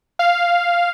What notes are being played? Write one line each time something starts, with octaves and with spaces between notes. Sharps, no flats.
F5